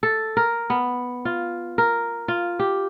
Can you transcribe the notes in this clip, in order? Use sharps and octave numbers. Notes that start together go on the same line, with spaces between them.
A4
A#4
B3
F4
A#4
F4
G4